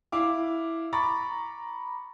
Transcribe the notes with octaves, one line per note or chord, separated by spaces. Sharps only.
E4 F5 D6
A#5 B5 C#6 D6 A6